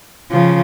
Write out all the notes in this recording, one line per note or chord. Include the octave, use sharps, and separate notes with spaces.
C#3 F3